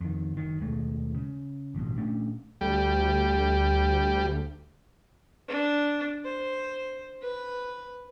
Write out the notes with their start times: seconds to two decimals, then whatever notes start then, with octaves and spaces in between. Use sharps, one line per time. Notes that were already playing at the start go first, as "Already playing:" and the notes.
0.01 F2 D#3
0.33 F#1 D#3
0.60 D#2 B2 G#3 A3
1.15 C#3
1.75 A1 G2 B2
1.98 A#2 A3 C#4 D4
2.61 D2 G3
5.48 D4
6.25 C5
7.22 B4